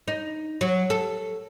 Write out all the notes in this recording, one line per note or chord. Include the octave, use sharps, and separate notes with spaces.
D#4
F#3
A4